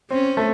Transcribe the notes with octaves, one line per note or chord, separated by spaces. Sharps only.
C4 C#4
A3